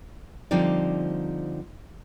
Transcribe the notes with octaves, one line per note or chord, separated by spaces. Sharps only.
D3 F3 G3 C4 D#4 D5